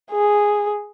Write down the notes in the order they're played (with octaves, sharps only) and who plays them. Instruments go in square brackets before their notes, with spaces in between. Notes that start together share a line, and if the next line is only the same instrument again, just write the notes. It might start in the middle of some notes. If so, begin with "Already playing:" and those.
[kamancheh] G#4